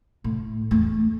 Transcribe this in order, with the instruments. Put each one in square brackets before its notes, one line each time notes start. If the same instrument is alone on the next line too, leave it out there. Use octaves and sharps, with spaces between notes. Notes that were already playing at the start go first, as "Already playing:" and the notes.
[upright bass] A2
E2 A3